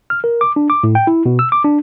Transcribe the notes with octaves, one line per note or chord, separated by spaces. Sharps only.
F6
A#4
D6
D4
D6
A2
G5
E4
B2
E6
D6
D4